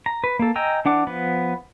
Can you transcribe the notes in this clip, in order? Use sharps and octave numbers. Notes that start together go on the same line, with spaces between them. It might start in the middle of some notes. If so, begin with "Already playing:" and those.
A#5
B4
A#3 A4
D#5 G5 G#5 A#5 E6
E3 D4 F#5 D6
F3 B3 B5